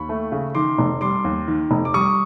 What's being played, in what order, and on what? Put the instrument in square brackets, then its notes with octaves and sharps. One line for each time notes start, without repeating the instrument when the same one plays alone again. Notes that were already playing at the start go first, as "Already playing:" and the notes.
Already playing: [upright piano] D#2 [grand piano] B5 C#6
[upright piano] A3
C#3
[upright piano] D#3 [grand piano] C6 D6
[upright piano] F1
[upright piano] G3 [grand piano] C6 D6
[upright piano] D#2
D#3
F1
[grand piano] D6
[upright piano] G3 [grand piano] C#6 D#6